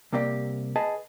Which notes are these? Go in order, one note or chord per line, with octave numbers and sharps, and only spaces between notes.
C2 C3 A#3 G4 D5
G#4 B4 D#5 A5